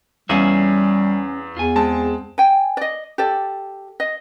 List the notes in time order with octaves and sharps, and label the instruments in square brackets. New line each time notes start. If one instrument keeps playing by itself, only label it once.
[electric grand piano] E2 F5 D#7 [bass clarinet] G3 [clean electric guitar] C#4 G#4 E5
[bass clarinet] E2 [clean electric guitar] F4 G#5
[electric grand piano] G#3 C4 A5
[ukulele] G5 G#5
D5 D#5
G4 A4 D5
D#5